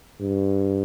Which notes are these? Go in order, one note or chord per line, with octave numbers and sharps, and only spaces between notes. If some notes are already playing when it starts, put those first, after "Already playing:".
G2